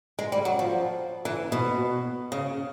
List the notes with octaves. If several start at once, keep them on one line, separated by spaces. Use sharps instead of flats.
G#3
G3
F#3
F3
E3
B2
C#3